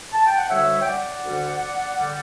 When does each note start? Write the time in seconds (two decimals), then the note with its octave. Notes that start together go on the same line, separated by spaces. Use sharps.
0.13 A5
0.26 G5
0.38 F#5
0.50 D2 D3 G3 C#5 E5
0.81 G5
0.86 D5 F#5
1.23 D2 D3 G3
1.98 D3 G3